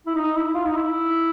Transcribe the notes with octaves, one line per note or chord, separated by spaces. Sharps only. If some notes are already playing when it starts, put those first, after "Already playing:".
E4
D#4
E4
F4
D#4
E4